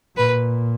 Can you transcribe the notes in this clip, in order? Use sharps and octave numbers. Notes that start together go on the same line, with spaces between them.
A#2 B4